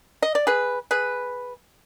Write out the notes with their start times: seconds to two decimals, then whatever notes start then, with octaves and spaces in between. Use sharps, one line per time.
0.22 D#5
0.35 D5
0.47 G#4 B4
0.91 G#4 B4